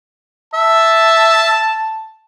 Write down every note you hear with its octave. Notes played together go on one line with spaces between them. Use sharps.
E5 A5